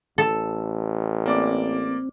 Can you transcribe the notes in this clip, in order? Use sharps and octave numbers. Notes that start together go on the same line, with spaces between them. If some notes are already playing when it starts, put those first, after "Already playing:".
A1 A4
A#3 C4 D5 D6